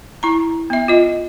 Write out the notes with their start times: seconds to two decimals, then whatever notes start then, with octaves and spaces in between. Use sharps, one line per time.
0.23 E4 A#5
0.70 B3 E5
0.88 F4 D#5